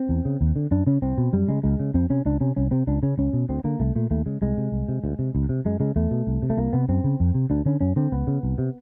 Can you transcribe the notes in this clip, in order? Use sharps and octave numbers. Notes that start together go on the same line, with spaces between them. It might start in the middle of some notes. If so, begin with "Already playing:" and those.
Already playing: C4
E2
C#3
D#2
D3
F#2 D4
C#3 C#4
C2 C4
B2
F#2 G3
C#3 G#3
C#2 G#3
C#3
F2 C4
C3 C#4
C#2 D4
C3 C#4
C2 C#4
C3 C4
C#2 D4
C#3 C#4
C#2 C#4
B2
D2 C4
D3 A#3
C2 A3
A#2 A3
D#2 A3
C#3 G#3
C2 G#3
C3
C2
C3
D2
C3
C#2
C3
F#2 G#3
C#3 G#3
E2 A3
B2
C2
C3
A3
C2 A#3
C3 B3
F#2 C4
C#3
F2
C3
D2 D4
D3 C#4
F#2 C#4
D3 C4
C#2 B3
C#3
C2
C3